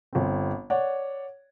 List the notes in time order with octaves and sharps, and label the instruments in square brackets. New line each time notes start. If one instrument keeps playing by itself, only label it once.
[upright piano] G1 C4
C#5 D5 F#5